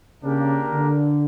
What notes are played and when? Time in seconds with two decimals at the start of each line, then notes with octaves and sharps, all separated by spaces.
0.23 C#3 A#3 D4 G4 A#4
0.71 D3